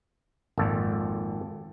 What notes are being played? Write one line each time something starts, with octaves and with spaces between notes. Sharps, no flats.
G#1 F2 A#2 A4